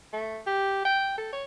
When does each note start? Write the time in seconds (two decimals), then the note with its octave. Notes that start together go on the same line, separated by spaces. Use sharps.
0.13 A3
0.47 G4
0.85 G5
1.18 A4
1.33 C#5